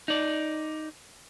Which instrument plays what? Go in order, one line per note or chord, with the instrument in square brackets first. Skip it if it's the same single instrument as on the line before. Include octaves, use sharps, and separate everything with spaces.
[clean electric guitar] D#4 D5